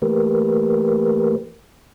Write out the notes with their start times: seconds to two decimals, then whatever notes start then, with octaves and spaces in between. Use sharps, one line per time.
0.02 E3 A3 A#3 G4 A#4 B4